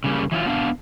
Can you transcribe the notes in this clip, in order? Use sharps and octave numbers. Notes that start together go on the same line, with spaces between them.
C#3 G3 A#3
E3 F#3 F4
B3 D4 D5 F5